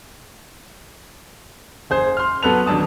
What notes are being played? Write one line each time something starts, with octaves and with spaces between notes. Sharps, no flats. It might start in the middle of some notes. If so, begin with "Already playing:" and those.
F#1 G#4 C5
C6 F6
F#3 B3 A4 B4 F7
D#1 F#3 D4 A5 D#6